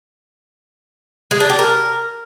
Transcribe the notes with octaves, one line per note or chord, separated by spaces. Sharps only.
G#3
D4
G4
A#4